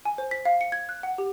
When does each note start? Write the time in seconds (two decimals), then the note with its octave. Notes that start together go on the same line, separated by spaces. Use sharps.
0.05 G#5
0.18 C5
0.31 B6
0.45 F5
0.61 C#7
0.72 G#6
0.89 F#6
1.03 F#5
1.18 G4